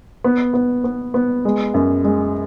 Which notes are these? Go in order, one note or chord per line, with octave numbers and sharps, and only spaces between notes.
B3
B3
B3
B3
G#3
F#2
G#3